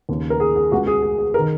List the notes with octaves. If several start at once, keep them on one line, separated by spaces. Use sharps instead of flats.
D#2 C#3
A#4
G#4
G#4
C#2 C#3 F#4
G#4
G#4
G#4
A#4
D#3